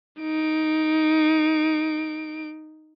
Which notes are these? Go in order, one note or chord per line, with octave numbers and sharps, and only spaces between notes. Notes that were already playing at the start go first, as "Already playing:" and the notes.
D#4 D7